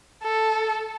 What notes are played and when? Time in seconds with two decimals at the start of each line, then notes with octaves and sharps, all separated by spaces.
0.23 A4